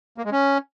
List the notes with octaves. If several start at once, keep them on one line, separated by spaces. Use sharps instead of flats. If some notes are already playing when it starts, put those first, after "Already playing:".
A#3
G#3
C#4